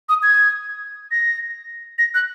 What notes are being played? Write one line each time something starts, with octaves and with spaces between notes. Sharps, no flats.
D#6
G#6
A#6
A#6
F#6